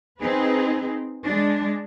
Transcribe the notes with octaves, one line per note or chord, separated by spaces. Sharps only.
C4 D#4 G#4 B4
G#3 D4